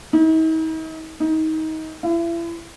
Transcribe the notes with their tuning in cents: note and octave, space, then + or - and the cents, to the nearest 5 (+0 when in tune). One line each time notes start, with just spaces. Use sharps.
D#4 +45
D#4 +25
E4 +35